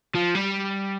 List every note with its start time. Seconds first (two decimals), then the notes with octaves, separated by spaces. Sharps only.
0.15 F3
0.35 G3